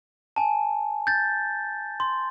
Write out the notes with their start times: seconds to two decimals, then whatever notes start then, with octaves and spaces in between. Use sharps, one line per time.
0.36 G#5 A5
1.07 G6 A6
2.00 C6